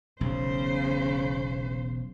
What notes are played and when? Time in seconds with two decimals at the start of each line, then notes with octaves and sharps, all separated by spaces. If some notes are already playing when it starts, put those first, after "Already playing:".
0.21 E1 B1 C#3 C5